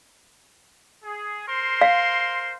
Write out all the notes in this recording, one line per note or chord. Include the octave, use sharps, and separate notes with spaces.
G#4
A#4 C5 C6
F5